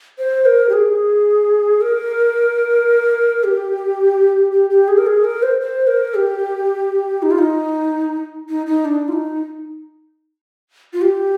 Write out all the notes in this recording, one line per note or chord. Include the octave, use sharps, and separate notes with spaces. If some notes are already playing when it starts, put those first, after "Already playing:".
C5
A#4
G4
G#4
A#4
G4
G4
G4
G#4
A#4
G#4
A#4
C5
C5
A#4
G4
D#4
F4
D#4
D#4
D#4
D4
F4
D#4
F4
G4